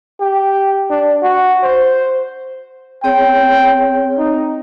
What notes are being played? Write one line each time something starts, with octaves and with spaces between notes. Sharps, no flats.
G4
D4
F#4
C5
C4 G#4 C#5 G5
D#4